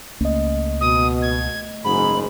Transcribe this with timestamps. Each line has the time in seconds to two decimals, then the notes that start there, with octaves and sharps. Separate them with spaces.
0.21 C#2 A3 A#3 C#4 D#5
0.81 B2 D#6
1.22 G#6
1.84 F#1 G#2 G#4 B5